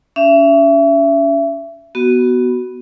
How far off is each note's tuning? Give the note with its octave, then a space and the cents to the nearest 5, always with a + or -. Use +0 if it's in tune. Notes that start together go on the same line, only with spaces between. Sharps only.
C#4 +35 E5 +25
B3 -5 F#4 +15